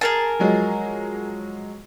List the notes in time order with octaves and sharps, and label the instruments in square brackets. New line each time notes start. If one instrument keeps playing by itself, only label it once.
[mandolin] G#4 A#4 A5
[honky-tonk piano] F3 F#3 G#3